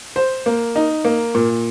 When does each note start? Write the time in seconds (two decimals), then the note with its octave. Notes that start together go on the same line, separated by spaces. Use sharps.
0.16 C5
0.46 A#3
0.76 D#4
1.05 A#3
1.35 A#2